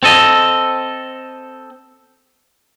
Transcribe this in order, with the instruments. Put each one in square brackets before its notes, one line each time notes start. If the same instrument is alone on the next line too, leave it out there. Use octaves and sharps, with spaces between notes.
[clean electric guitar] C4 A4 D#5